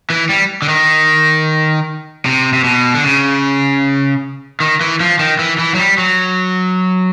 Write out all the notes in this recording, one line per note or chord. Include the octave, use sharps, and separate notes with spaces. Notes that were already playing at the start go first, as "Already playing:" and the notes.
E3
G3
D3
D#3
C3
C3
B2
D3
C#3
D#3
E3
F3
D#3
E3
E3
F#3
G3
F#3